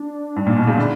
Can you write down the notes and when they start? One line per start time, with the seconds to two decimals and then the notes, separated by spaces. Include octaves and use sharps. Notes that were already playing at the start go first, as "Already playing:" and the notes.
Already playing: D4
0.36 G2
0.47 A#2
0.56 B2
0.67 C#3
0.77 D3 E4